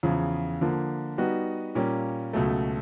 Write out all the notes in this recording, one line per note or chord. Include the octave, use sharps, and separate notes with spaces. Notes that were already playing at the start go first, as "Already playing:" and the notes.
E2 C#3 F3
D3 F3 A#3
G3 B3 D#4 F#4
A#2 G3 A#3 C#4
C#2 B2 F#3 A3